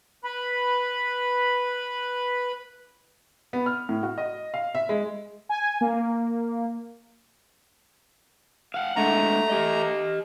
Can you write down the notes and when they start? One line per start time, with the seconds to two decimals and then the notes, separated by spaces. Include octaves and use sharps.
0.24 B4 B5
3.53 B3
3.66 F6
3.89 A2
4.03 F#4
4.18 D#5
4.54 F5
4.75 E5
4.89 G#3
5.49 G#5
5.81 A#3
8.74 F5 F#5
8.96 G#3 A3 D4 F#5 A#5
9.50 G4 D#5